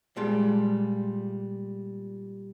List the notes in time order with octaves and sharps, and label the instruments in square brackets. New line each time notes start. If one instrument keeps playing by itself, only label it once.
[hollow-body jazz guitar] A#2 G3 G#3 A5